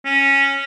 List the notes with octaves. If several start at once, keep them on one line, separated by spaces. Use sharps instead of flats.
C#4